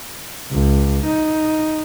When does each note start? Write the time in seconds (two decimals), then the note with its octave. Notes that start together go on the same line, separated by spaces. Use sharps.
0.51 C#2
1.07 D#4